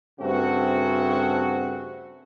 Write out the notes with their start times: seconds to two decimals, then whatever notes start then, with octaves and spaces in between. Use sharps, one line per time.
0.20 G2 C#3 A3 C4 F#4